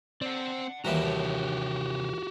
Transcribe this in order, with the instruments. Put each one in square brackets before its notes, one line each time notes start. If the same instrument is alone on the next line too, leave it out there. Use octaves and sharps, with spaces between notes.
[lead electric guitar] C4 [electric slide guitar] D5 F#5
[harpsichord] D#2 E3 G3 [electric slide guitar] A#3 A#4 A#5 [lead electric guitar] F#4 G4
[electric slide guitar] C3 C#5 A5